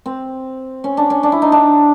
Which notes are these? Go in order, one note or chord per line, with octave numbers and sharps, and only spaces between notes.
C4
C#4
D4
C#4
D4
E4
D#4
D4